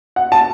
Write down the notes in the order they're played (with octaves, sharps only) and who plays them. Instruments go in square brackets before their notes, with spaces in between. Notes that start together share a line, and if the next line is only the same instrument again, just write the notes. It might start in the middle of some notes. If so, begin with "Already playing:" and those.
[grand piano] F#5
A5